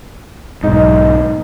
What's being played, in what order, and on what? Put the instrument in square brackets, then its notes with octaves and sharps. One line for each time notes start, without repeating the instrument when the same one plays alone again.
[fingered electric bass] B1 G#2 [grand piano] D#4